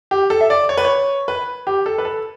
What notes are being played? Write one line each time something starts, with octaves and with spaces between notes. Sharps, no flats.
G4
A4
E5
D5
C#5
B4
C#5
B4
G4
A4
B4
A4